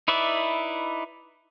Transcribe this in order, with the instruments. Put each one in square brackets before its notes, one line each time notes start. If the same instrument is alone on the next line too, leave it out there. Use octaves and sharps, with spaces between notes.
[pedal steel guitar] D#4 E4 B4 D5 E5